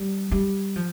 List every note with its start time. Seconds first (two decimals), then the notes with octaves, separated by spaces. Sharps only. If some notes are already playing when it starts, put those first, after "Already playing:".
Already playing: G3
0.31 G3
0.76 F3